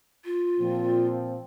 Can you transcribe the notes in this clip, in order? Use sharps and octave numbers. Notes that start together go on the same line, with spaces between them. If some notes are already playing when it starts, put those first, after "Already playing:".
F4
A#2 F3 C4